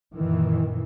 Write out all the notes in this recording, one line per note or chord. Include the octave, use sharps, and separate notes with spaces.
F#2 A#2 D#3 E3